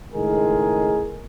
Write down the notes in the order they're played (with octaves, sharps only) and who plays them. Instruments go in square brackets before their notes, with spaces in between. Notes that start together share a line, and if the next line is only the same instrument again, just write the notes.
[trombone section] C#2 A2 D#3 G#3 G#4 A#4